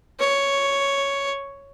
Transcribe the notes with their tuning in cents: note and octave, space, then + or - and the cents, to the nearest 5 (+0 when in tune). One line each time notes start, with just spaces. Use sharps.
C#5 +5